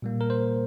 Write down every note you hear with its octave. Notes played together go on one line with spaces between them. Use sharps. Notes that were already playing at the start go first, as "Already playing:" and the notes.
A#2 G3 A#3
A#4
C5